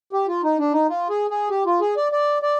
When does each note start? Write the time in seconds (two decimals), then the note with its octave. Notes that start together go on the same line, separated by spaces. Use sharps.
0.13 G4
0.28 F4
0.44 D#4
0.59 D4
0.73 D#4
0.89 F4
1.09 G#4
1.30 G#4
1.50 G4
1.66 F4
1.81 G#4
1.97 D5
2.12 D5
2.42 D5